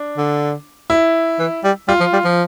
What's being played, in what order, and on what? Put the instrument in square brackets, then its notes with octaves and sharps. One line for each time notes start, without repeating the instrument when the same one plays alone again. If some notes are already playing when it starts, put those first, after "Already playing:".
Already playing: [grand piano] D4
[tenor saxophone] D3
[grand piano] E4
[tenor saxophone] E3
G3
[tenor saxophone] G3 [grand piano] F4
[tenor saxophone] F3
G3
F3